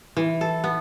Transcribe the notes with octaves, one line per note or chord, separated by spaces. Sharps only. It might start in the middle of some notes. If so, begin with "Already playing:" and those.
E3
A4
B3